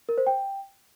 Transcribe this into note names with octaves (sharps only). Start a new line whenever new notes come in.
A#4
C5
G5